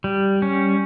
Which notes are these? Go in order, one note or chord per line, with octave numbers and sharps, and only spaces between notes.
G3
C#4